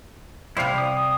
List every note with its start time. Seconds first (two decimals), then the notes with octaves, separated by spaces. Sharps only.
0.57 C3 G3 E4 C5 F5
0.78 D#6